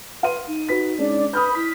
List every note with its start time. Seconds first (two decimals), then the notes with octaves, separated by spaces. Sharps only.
0.23 B4 F5 C6 D#7
0.47 D#4
0.69 F#4 B4 B6
0.98 G#3 C#4 D4 D5
1.33 B4 B5 D#6 F6 G6
1.55 E4 B6